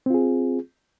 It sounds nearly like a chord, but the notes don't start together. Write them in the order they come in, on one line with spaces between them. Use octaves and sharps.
C4 F4 G#4